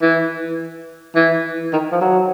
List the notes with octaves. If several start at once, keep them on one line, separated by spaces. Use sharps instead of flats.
E3
E3
D#3
F3
F#3